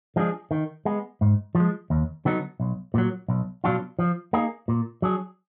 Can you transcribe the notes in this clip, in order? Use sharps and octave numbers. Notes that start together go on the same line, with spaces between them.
F3 G#3 D4 G#4
D#3
G#3 B3
G#2
F3
G#3
D#2
D3 F#3 B3 D#4
B1
A#2 F#3
B1
B2 F#3 D4 F4
F3
A#3 D#4 G#4
A#2
F#3 D4 G#4